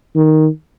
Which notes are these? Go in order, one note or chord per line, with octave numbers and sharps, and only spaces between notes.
D#3